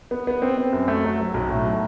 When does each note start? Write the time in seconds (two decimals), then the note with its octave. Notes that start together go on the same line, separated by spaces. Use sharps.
0.11 B3
0.27 B3
0.42 C4
0.58 C4
0.73 F#2
0.88 A3
1.04 F#3
1.20 F#3
1.34 B1
1.50 A2
1.65 F#3